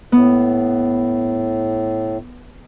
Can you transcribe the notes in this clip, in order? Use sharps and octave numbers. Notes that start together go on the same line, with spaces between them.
A2 B3